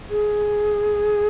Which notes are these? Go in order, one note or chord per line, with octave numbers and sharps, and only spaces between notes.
G#4